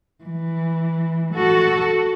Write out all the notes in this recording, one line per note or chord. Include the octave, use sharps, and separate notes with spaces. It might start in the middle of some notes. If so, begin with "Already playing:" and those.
E3
F#4 A4